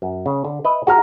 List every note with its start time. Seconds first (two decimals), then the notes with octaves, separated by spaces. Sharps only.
0.02 F#2
0.26 C#3
0.45 D3
0.65 B4 D#5 E5
0.87 F#4 G#4 A#5 F6